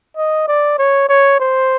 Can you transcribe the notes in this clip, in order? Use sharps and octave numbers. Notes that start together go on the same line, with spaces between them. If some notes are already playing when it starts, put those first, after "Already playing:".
D#5
D5
C#5
C#5
C5